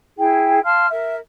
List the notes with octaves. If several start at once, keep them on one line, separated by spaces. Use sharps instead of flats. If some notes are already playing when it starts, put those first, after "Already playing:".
E4 G#4 G5
F5 A5 C6 F6
A#4 E5